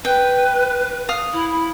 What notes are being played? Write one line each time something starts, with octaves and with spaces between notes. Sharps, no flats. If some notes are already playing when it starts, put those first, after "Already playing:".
B4 G5
F5 D#6
E4